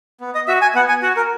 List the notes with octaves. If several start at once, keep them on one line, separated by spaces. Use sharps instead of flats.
B3
D#5
F#4 E5
G#5
B3 F#5
G#5
F#4 F#5
A#4